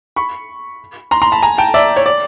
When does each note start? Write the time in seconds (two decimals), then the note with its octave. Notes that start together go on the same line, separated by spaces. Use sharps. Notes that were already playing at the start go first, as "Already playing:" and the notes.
0.16 B5 C#6
1.11 A#5 C6
1.22 A#5 C6
1.32 A5 B5
1.43 G#5 A#5
1.58 G5 A5
1.74 D5 E5
1.97 C#5
2.06 D5